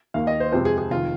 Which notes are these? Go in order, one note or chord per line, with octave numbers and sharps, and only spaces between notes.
D#2 D#3 A#3 F5
D#5
C5
F2 C3 G#3 C4 C5
G#4
G#4
F1 D#3 F4